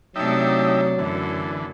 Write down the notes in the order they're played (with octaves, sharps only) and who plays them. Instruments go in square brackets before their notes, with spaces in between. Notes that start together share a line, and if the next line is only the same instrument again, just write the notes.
[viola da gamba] C3 A3 D4 [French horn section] F#3 C#5 [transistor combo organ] D#4 E5 G5
[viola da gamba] F#2 [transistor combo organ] D3 E3